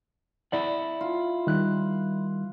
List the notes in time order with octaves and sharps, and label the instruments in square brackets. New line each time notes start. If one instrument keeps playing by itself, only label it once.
[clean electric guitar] E4 D5 F#5
[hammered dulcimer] F4
[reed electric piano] D#3 G3 F#6